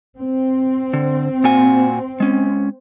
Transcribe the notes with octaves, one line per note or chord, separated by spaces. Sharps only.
C4
D3
A#2 F#4 G#5
G#3 C#4